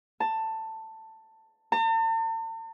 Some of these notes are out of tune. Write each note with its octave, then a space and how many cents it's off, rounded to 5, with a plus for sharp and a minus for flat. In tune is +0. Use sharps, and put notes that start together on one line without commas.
A5 +15
A5 +45